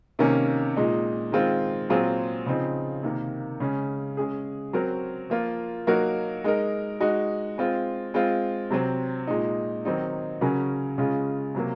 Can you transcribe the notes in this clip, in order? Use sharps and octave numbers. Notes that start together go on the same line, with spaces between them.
C3 D#3 A#3 C#4
A#2 G#3 D#4
D#3 G#3 C4 F4
A#2 F#3 C4 F4 G#4
C#3 F3 C4 D#4
C3 D#3 A#3
C#3 G#3 C#4
G#3 C#4 G#4
F#3 C4 F#4 A#4
F3 A#3 F4
F#3 A#3 D#4 F#4 A#4
G#3 D#4 A#4
G#3 D#4 F#4
G#3 C4 F4
G#3 C4 F4
C3 F#3 C4
A#2 G#3 D#4
D#3 F#3 C4 D#4
C#3 F#3 C#4 F#4 A#4
C#3 G#3 C#4 F4
C3 F#3 A#3